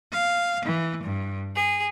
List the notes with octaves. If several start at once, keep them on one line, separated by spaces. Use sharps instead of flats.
F5
E3
G2
G#4